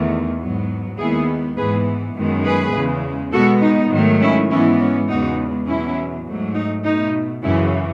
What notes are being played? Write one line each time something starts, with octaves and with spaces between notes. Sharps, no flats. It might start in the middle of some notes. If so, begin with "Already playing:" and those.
Already playing: E2 D#3 A3
G#2 F#3 B3
D#2 D#3 G#3 B3 E4 G#4
G#2 E3 G#3 B3 G#4 B4
F#2 D#3 G#3 B3
G#4 B4
E2 C#3 G#3
B2 G#3 B3 F#4 A4
D#4
G#2 D#3 F#3 A3
C#4 E4
G#2 E3 G#3 B3 C#4 E4
C#4
E2 C#3 G#3 B3 D#4 F#4
E2 B2 F#3 C#4 E4
G#2 F#3 A3
D#4
B2 A3 D#4
F#2 C#3 E3 C#4 E4